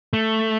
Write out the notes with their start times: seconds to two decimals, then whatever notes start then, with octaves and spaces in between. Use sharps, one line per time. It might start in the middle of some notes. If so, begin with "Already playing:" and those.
0.13 A3